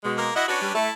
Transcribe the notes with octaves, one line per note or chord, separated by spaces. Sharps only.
B2 G#3
A#3 A#4
E4 F#4 D#5 F#5
C#4 D4 F#4 B4
G3
A3 E4 A5